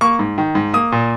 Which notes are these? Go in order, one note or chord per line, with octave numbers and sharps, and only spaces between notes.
A#3 C#6
G#2
D#3
G#2
A#3 D#6
A#2